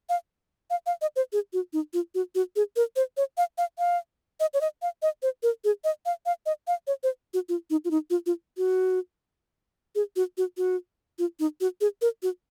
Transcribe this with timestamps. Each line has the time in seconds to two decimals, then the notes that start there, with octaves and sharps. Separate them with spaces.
0.09 F5
0.70 F5
0.86 F5
1.02 D#5
1.16 C5
1.33 G#4
1.53 F#4
1.73 D#4
1.93 F4
2.15 F#4
2.35 F#4
2.56 G#4
2.76 A#4
2.96 C5
3.17 C#5
3.38 F5
3.58 F5
3.79 F5
4.40 D#5
4.54 C#5
4.61 D#5
4.82 F5
5.02 D#5
5.23 C5
5.43 A#4
5.64 G#4
5.84 D#5
6.06 F5
6.26 F5
6.46 D#5
6.67 F5
6.87 C#5
7.03 C5
7.34 F#4
7.49 F4
7.70 D#4
7.85 F4
7.91 D#4
8.10 F4
8.26 F4
8.57 F#4
9.95 G#4
10.16 F#4
10.38 F#4
10.57 F#4
11.19 F4
11.40 D#4
11.61 F#4
11.81 G#4
12.02 A#4
12.23 F#4